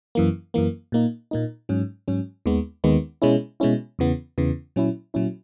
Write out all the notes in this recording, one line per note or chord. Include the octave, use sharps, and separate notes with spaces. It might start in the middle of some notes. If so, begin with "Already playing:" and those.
F#2 E3 A#3
F#2 E3 A#3
A#2 A#3 D#4
A#2 A#3 D#4
G#2 F#3 C#4
G#2 F#3 C#4
D#2 D#3 G#3 B3
D#2 D#3 G#3 B3
B2 G#3 C#4 E4
B2 G#3 C#4 E4
E2 C#3 E3 B3
E2 C#3 E3 B3
A#2 F#3 C#4 E4
A#2 F#3 C#4 E4